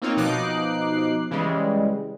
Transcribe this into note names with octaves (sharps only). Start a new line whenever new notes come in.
A#3 C4 D#4 F4 C#5
B2 F3 D#4 D6 F#6 C7
C#3 E3 G3 G#3